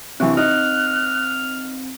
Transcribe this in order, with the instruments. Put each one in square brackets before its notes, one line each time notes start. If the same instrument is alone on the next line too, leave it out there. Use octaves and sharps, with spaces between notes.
[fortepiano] C3 E3 [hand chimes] C4 [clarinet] D4 [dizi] C#6
[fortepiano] D#4 [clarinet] F6 [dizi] F#6